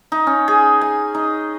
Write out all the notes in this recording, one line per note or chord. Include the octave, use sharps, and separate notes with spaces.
D#4
C#4
G#4
G#5
D#4